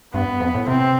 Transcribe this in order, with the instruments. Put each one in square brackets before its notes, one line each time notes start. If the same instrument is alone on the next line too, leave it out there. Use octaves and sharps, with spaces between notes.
[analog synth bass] G2 [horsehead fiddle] B3
[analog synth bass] F2
A2
[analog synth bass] C3 [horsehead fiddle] C4